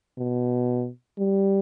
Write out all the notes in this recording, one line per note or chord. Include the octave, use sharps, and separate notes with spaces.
B2
G3